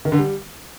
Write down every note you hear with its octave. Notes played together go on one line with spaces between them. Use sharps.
D#3
D3
G3